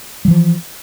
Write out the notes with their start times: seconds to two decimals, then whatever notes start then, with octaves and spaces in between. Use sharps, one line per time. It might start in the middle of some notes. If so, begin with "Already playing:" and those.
0.25 G3
0.28 E3
0.31 F3